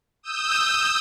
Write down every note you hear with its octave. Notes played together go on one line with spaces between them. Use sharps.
D#6 E6 G6